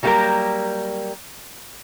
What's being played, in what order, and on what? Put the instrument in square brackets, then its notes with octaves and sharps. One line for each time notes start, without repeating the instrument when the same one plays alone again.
[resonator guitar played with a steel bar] F#3 G3 A#3 E4 G4 A#4